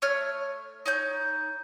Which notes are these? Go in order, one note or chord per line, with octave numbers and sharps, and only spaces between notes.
A3 C#5 F6
D#4 C#5 G6